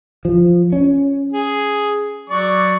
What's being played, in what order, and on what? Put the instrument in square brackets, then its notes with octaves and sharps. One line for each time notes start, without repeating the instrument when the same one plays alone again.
[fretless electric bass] F3
C#4
[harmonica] G#4
F#3 D5 C#6